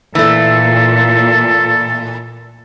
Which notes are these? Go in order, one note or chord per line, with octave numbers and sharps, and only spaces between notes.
A#2 E3 A3 A4